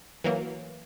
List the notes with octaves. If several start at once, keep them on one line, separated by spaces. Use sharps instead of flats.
E3 F#3 A#3